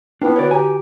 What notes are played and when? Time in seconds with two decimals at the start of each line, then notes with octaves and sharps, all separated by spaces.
0.22 B3 D4 E4 F4 G5
0.36 D3 F#4 B4 C#5 D5
0.51 G4 G#5 A#5